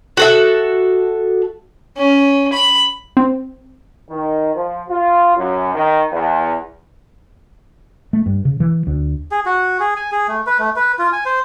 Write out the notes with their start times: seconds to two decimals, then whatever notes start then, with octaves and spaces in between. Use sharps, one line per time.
0.17 F#4 A4 E5
1.97 C#4
2.53 B5
3.17 C4
4.09 D#3
4.53 F3
4.88 F4
5.36 F#2
5.74 D#3
6.11 E2
8.13 A3
8.26 G2
8.45 C#3
8.60 E3
8.87 D2
9.31 G#4
9.46 F#4
9.80 G#4
9.97 G#5
10.12 G#4
10.28 A3
10.47 B4
10.59 A3
10.76 B4
10.99 F4
11.13 G#5
11.25 C5